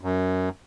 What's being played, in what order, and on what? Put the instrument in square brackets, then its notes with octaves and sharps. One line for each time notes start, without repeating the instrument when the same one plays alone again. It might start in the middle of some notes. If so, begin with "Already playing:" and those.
[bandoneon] F#2